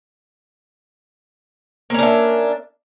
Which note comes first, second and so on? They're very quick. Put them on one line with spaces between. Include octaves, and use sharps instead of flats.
A#3 C#4 D4 E5